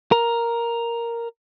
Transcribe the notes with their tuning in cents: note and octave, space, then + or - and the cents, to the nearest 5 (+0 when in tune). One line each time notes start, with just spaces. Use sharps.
A#4 +0